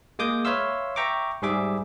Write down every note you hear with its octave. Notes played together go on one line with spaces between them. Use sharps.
G#3 A#3 D6 D#6 G6
B4 C#5 E5 F5 C6 E6
E5 G5 A#5 C#6 D6
G#2 G3 G#4 E5 D6